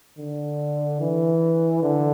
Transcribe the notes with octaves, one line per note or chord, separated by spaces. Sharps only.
D3
E3
D3